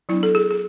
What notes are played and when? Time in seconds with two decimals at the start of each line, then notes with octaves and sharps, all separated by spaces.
0.09 F#3 B3 D4 E4
0.23 A4
0.35 G#4
0.51 G#4